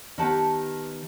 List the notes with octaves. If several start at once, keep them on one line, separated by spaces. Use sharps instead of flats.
D#3 B3 G4 F#5 A5